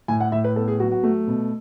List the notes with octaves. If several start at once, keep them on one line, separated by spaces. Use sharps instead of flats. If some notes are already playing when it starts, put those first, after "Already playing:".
A2 G#5
F#5
A2 E5
B4
B3 A4
G#4
F#3 F#4
F#4
A3
B2